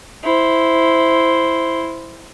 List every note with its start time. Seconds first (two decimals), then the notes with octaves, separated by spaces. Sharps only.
0.24 E4 C5